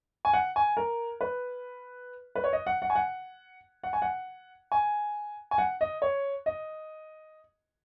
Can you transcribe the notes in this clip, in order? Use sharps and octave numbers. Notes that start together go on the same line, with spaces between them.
G#5
F#5
G#5
A#4
B4
B4
C#5
D#5
F#5
F#5
G#5
F#5
F#5
G#5
F#5
G#5
G#5
F#5
D#5
C#5
D#5